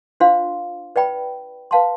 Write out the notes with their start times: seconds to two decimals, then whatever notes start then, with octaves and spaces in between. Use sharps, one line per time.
0.20 D4 F4 C5 F5 C6
0.96 B4 D5 G5 B5
1.71 B4 F5 A5 C6